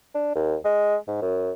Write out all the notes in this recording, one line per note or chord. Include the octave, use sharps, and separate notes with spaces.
D4
D#2
G#3
G#2
F#2